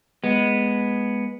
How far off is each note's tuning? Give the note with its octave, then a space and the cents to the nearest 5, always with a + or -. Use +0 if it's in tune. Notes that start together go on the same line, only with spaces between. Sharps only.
G#3 +0 B3 +0